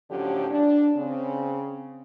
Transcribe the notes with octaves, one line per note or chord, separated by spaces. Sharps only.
A2 D3 F3 F#3 C#4 G4
D4
C#3 C4